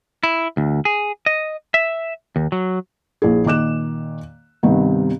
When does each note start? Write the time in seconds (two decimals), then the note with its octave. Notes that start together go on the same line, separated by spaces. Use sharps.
0.23 E4
0.57 D2
0.85 G#4
1.26 D#5
1.74 E5
2.36 D#2
2.52 F#3
3.22 A#1 E4 G#4
3.45 A#2 D#3 D6 F#6 E7
4.63 G2 C3 D#3 B3